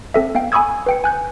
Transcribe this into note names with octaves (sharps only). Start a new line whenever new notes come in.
C4 A4 E5
B3 F5 G5
G#5 B5 C#6 D#6 E6 G#6
B4 G5 C#7
G#5 F#6 G6